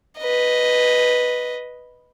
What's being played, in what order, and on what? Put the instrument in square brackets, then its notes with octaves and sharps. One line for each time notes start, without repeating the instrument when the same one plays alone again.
[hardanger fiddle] B4 D#5